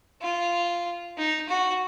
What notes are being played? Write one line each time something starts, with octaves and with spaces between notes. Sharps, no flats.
F4
D#4
F#4